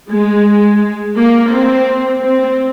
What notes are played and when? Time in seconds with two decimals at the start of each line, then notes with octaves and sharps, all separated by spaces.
0.12 G#3
1.18 A#3
1.53 C4
2.22 C4